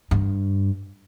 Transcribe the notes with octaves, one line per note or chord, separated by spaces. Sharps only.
G2